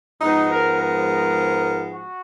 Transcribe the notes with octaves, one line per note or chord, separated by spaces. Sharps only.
G#2 F3 G#3 B3 D#4
A#4
A#4
F#4